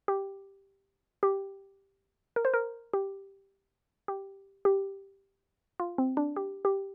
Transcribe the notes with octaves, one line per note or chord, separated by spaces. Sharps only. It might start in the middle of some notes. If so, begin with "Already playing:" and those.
G4
G4
A#4
C5
A#4
G4
G4
G4
F4
C4
D4
G4
G4